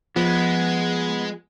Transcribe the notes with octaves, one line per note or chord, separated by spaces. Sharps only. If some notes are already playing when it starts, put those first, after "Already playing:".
F3 G#3 B3